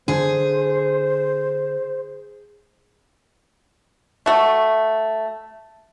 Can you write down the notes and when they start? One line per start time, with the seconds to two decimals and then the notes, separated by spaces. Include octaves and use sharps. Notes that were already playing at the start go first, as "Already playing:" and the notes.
0.08 D3 G#4 C5
4.26 A3 F#4